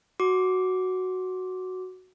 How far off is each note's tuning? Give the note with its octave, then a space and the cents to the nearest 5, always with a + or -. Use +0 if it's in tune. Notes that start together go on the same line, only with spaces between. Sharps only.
F#4 +0 D6 -10